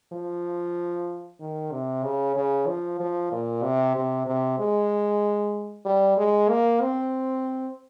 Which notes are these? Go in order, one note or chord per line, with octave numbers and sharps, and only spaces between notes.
F3
D#3
C3
C#3
C#3
F3
F3
A#2
C3
C3
C3
G#3
G3
G#3
A#3
C4